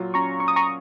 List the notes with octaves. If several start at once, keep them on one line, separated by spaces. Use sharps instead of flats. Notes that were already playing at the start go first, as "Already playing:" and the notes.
Already playing: A#2 F#3 F4
C#4 A#5 C#6
C#4 C#6
D#6
A#5 C#6